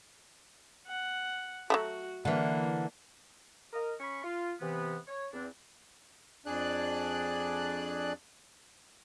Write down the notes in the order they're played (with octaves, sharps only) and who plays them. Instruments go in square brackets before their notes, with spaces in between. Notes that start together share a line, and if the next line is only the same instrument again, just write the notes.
[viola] F#5
[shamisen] F#3 G#3 A3 [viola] F#4
[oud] D3 E3 [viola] A#3
[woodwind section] A#4 D#5
C#4 G#5 B5 C#6
F4
C3 E3 B3
C#5
E2 C4 D4
[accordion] F2 D4 G#4 D5 F#6